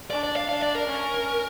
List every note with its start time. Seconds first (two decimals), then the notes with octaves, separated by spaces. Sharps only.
0.10 D4 D5
0.24 D5
0.36 F5
0.49 D4 F5
0.63 D5
0.75 A#4
0.87 C#4